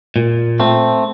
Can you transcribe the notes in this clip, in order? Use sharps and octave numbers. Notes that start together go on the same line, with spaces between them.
A#2
A3 C4